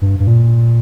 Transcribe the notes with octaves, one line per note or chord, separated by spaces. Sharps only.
G2
G2
A#2